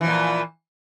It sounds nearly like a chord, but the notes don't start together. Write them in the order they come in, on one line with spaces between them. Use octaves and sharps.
E3 F3 A#2